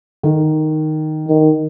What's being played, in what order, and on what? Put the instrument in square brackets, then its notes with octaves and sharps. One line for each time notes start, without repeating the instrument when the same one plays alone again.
[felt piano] D#3
[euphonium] D#3